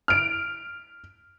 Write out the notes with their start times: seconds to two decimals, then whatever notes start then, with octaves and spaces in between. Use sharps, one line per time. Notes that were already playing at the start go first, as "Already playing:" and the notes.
0.08 F6 D7